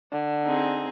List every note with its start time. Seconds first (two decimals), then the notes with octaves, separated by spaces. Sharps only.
0.12 D3
0.44 C4 D#4 G#4